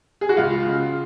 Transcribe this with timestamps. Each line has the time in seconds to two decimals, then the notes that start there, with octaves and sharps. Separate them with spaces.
0.21 G#4
0.29 F#4
0.37 C#2 F4
0.66 C#3